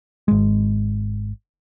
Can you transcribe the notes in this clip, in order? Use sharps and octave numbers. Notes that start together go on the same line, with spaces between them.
G#1 G#3